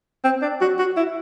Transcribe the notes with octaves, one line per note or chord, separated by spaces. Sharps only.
C4
D4
F#4
F#4
E4